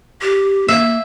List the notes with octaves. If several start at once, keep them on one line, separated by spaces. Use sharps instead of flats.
G4
A#3 E5